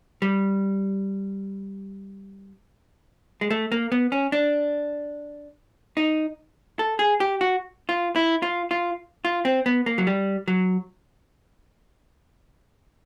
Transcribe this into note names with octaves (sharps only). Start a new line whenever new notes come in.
G3
G#3
A3
A#3
B3
C#4
D4
D#4
A4
G#4
G4
F#4
F4
E4
F4
F4
F4
C4
B3
A#3
F#3
G3
F#3